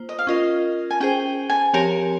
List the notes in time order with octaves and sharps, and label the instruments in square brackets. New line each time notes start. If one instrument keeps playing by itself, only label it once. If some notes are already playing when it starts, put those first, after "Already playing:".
Already playing: [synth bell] A#3 F4 C5
[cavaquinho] D#5
F5
[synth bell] C#4 F4 A#4 [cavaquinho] D#5
[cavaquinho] G#5
[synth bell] C#4 G#4 C5 [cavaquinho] G5
[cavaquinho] G#5
[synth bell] F3 C4 G4 A#4 C#5 [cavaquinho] A#5